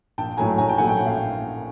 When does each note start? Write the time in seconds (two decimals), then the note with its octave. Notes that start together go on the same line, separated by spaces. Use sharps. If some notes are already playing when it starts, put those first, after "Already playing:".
0.18 A#1 G5 A5
0.37 A2 F#3 A3 G#5 A#5
0.58 A#1 G#5 A#5
0.69 G5 A5
0.78 A2 F#3 A3 F#5 G#5
0.89 G5
0.97 A#1 F#5
1.06 F5 G5